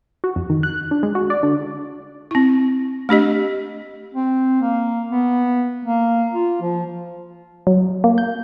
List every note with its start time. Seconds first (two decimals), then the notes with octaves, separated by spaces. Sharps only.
0.24 F#4
0.36 F2
0.50 D#3
0.63 F#6
0.91 D4
1.03 G#3
1.15 F#4
1.30 D5
1.43 D3
2.31 C4 E4
3.09 A3 D4 G4 D#5
4.14 C4
4.61 A#3
5.11 B3
5.85 A#3
6.34 F4
6.62 F3
7.67 F#3
8.04 A#3
8.18 G6